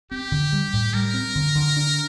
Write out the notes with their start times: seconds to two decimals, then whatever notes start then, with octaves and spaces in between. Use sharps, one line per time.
0.11 C4 G4
0.32 D3
0.52 G3
0.73 A2
0.94 G3 A#4
1.14 C4
1.35 D3
1.55 D3
1.77 D4